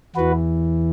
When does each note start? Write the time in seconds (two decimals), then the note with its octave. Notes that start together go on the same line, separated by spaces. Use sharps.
0.16 E2 E3 F#4 B4